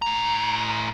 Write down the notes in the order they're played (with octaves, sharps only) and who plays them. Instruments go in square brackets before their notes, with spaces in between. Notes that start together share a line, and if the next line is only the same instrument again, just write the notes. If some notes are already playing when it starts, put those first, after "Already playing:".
[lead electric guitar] A2 A#5